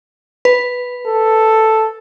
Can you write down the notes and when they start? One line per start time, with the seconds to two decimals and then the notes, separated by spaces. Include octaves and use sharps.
0.45 B4
1.07 A4